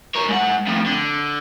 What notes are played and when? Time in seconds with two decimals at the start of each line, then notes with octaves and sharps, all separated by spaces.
0.15 A#4 C#5
0.28 G#2 F#5
0.67 F2 A2
0.86 D3